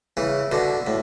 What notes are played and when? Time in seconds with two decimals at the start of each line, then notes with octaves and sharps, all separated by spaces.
0.17 C#3 E3
0.52 B2 D3
0.87 A2